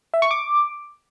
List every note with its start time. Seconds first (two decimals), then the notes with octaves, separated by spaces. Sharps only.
0.14 E5
0.22 C#6
0.31 D6